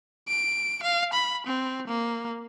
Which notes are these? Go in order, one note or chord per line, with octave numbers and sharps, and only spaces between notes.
D7
F5
B5
C4
A#3